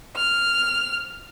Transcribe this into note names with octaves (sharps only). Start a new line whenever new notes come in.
F6